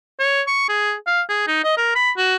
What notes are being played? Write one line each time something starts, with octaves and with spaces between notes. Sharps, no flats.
C#5
C#6
G#4
F5
G#4
D#4
D#5
A#4
B5
F#4